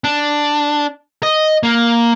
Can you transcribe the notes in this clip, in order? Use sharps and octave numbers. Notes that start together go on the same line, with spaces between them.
D4
D#5
A#3